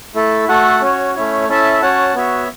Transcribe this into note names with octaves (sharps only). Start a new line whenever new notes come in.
A3 E4 A4
A3 F#4 A4 F#5
C#4 F#4 C#5
A3 C#4 E4 C#5
C#4 E4 A4 E5 A5
C#4 F#4 C#5 F#5 A5
B3 F#4 C#5 E5